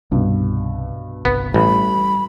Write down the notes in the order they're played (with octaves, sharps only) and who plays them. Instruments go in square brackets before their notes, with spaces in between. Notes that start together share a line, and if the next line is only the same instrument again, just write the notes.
[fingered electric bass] C2 [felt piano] G2 B2
[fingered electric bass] G1 C2 [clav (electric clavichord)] B3
[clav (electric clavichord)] A1 [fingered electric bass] G3 [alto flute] B5